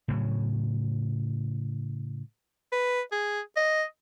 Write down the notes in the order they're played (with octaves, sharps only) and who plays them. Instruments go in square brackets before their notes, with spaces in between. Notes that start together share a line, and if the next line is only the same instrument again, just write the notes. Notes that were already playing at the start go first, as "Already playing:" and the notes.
[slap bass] A2 C#3 F#3
[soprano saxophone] B4
G#4
D#5